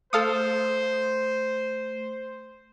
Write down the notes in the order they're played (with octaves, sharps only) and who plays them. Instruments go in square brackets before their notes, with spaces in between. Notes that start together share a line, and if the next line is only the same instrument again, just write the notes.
[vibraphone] A3 [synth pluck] A4 F5 D#6 [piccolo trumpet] C5